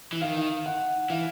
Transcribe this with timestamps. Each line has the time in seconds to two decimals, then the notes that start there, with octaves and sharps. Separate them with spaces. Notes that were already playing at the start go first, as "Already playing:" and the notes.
0.13 E3
0.21 D#3 F5
0.66 F#5
1.10 E3 F5